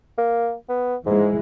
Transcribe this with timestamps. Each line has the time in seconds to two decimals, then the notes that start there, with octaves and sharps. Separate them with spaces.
0.18 A#3
0.69 B3
1.06 G#2 E3 G#3